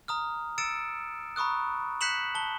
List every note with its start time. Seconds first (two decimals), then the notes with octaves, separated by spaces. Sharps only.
0.08 A#5 D#6 F6
0.58 E6 A6 C#7 D7 E7
1.36 A#5 B5 C#6 D#6 F#6
2.01 F#6 G6 B6 C#7 E7 F#7
2.35 A5 G7